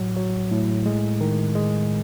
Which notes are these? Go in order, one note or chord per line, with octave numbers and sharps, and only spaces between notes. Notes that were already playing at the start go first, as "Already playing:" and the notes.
Already playing: A2 F#3
F#3
A2
G#3
D#3
G#3